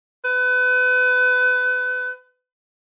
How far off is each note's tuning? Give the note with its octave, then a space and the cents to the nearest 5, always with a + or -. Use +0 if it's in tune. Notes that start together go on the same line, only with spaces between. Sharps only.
B4 +30